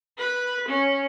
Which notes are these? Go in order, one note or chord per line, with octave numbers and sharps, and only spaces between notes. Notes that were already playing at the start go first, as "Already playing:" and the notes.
B4
C#4